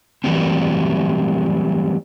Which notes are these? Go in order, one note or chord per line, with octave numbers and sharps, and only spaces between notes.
E3 F#3 G3 A3 C4